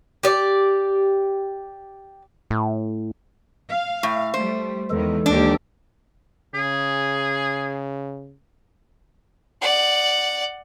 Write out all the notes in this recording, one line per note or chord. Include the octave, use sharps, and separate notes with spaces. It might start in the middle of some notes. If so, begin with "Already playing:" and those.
G4 D5
A2
F5
A2
G3 A3 C5
E2 D#3 E3 G#3 A4
D#2 A#3 D4 G4
C#3 G#4
D5 F#5